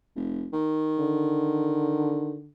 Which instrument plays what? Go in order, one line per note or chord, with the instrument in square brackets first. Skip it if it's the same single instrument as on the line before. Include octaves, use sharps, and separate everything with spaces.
[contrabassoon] F1
D#3
[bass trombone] D3